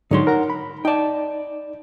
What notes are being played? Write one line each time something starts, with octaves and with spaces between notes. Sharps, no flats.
G#2 D3 F#3 D#4 C#5 C6
A#4 F#5 A#5
B5
D#4 D5 G5 A5